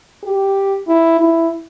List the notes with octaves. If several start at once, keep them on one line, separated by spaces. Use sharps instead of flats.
G4
E4
E4